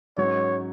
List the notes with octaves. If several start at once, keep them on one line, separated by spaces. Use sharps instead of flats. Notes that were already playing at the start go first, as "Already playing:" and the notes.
G#2 F#3 C#4 C#5